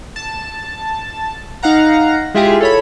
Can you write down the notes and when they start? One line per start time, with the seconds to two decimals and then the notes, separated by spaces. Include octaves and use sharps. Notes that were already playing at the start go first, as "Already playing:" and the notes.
0.16 A5
1.63 D#4 F5 F#5 A#5
2.35 G#3 E4 F4 G4 G#4
2.61 A4 C#5 B5